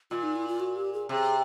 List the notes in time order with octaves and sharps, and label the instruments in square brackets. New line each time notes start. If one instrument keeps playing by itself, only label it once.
[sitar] A#2 [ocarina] F4
[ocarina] D#4
E4
F4
F#4
G4
G#4
[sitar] C3 [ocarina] G#4